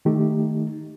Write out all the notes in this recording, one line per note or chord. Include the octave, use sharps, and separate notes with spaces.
D#3 A3 D#4 G4